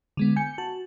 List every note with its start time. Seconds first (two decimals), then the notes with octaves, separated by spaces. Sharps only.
0.17 D3 G#3 B3
0.36 G#5 G6 C#7
0.58 F#4 A5